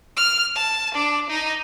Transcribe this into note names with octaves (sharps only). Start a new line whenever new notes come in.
F6
A5
D4
D#4